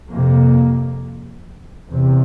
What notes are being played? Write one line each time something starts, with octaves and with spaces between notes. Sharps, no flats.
F2 C3 A#3
E2 C3